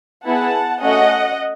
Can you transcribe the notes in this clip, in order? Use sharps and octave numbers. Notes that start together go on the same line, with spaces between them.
B3 E4 G#4 F#5 A5
A3 C#4 F#4 D#5 F#5